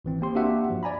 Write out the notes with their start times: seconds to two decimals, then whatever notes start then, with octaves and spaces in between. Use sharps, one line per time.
0.05 G#1 E3 C4
0.21 A#3 C4 G4 C6
0.35 A#3 D4 F#4 G4 E5 F#5
0.70 G2 F3
0.83 D5 G#5 A#5 B5